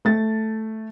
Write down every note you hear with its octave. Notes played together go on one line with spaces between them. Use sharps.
A3 A6